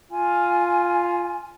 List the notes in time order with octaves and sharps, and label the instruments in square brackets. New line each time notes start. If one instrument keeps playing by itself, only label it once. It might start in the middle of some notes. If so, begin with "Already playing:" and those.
[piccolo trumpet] F4 [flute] G#5